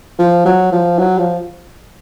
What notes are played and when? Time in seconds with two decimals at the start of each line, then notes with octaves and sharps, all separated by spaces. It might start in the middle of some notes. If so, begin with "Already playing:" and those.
0.19 F3
0.45 F#3
0.72 F3
0.98 F#3
1.18 F3